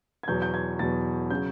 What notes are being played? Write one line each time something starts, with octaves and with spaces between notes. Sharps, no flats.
G#6
E2 B2 F#3 G6
G6
G#6
E2 B2 F#3 A6
C#3 F#3 G6